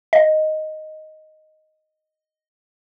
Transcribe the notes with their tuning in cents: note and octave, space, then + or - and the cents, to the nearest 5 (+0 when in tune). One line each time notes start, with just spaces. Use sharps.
D#5 +0